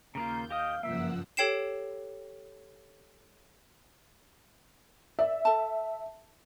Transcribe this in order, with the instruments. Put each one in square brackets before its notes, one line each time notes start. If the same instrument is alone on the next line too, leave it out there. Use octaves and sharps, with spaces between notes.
[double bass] D#2 [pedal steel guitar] C#3 A#3 F4 [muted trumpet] A#5 [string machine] G6
[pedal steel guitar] G4 D#5 D#6 [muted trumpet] F5
[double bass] F#1 G2 [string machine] F3 F#5 E6 [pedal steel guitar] A#3 [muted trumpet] E5
[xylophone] G4 A4 C#5 G5 C7 E7
[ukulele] D5 [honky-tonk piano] E5
[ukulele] A4 A5